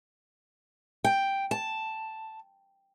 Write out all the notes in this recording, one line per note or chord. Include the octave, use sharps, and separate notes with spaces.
G5
A5